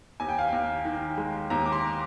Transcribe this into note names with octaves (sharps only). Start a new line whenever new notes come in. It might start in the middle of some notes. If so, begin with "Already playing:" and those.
D#2 G#5
G5
F5
D#2 G5
D#3
G#3
D#2 A#5
D6
C6